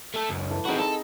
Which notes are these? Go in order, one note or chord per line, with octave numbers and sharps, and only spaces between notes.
A3 A4
C#2 F#2
E3 A4
C4 D#4 F#4 G#4 B5
C4 D#4 A4 D#5